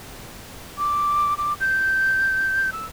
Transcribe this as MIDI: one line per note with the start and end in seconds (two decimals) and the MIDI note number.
0.78 1.34 86
1.38 1.53 86
1.61 2.70 91
2.72 2.85 88